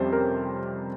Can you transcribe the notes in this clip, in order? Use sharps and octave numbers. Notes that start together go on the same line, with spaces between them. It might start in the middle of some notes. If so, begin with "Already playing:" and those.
Already playing: F2 C3 G3 C#4 C5
A#4